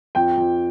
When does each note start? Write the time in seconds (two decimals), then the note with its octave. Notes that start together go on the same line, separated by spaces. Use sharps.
0.15 F2 G5
0.37 F2